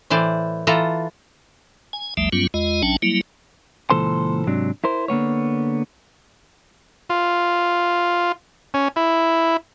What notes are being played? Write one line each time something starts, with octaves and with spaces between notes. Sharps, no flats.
A2 E3 C5 D5
E3 F4 A4 A#5
G#5
A1 D#2 F3 G3 A3 E5
G2 F#3 G3 B3 C#4 F4
E2 G#3 F4 D#5
A1 F#3 C#4 D4 G5 A5
F#3 G3 A#3 E4
C#2 A#2 E3 A4 C5 C6
G#2 C3 F#3 D4
E4 A#4 C5
D3 A#3 B3 C#5
F4
C#4
E4